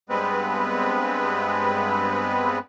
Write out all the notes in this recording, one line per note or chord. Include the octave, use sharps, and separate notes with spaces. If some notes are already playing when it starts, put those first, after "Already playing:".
G2 G#3 B3 C4 B4